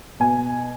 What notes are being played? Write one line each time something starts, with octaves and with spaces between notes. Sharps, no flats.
B2 G#5